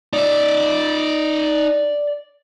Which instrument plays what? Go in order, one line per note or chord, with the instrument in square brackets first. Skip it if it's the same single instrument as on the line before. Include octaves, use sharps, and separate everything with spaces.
[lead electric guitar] D#4 E5 [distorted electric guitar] D5